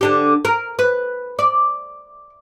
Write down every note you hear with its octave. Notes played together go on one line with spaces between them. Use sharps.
D3 D4 G4
A#4
B4
D5